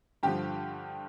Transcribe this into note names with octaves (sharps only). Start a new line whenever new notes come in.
G2 D3 F3 G4